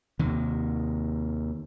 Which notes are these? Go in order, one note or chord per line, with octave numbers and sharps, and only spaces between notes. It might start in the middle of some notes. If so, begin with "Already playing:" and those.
D#2 C3 D#3